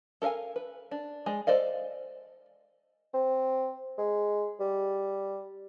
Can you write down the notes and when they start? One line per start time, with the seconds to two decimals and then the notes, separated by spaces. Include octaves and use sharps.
0.22 A4 A#4 E5 F5 G#5
0.56 B4
0.91 D4
1.26 G#3 D5
1.47 A4 C5 D5 D#5 F5
3.14 C4
3.98 G#3
4.60 G3